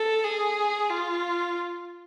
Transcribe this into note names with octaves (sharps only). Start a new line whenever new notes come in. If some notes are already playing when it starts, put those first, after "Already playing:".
Already playing: A4
G#4
F4